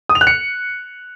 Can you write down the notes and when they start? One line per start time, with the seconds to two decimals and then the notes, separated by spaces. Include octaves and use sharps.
0.09 D#6
0.15 F7
0.21 F#6
0.27 C#7